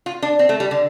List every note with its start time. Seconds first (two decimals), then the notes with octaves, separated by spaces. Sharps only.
0.06 F4
0.22 D4
0.39 C4
0.49 A3
0.60 G3
0.71 D3